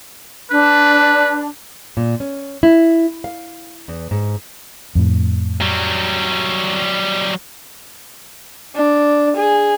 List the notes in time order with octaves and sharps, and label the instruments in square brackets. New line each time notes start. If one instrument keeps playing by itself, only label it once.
[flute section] D4 [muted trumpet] B4
[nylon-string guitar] A#2
C#4
E4
F5
E2
G#2
[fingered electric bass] F2 A2
[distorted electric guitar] F#3 G3
[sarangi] D4
G#4